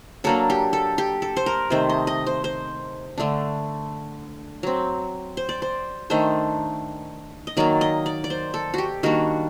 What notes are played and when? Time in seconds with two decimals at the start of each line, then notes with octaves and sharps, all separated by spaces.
0.24 F#3 A#3 D4 A4
0.50 G4
0.73 A4
0.98 G4
1.22 A4
1.37 C5
1.46 A#4
1.70 C3 D#3 A3 C5
1.89 D#5
2.07 D#5
2.26 C5
2.44 C5
3.18 D3 A3 D4
4.63 F#3 C4
5.37 C5
5.49 D5
5.62 C5
6.10 D#3 A3 D4 C5
7.47 D#5
7.57 D#3 F#3 A#3 D5
7.81 D#5
8.06 D5
8.24 D5
8.30 C5
8.54 A4
8.74 F#4 G4
9.03 D#3 G3 A#3 D4 F#4